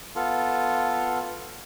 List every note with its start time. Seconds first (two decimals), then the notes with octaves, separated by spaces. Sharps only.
0.16 B3 F4 A4